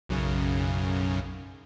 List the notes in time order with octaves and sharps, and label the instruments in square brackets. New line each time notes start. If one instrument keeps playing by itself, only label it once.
[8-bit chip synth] B1 F#2 C#3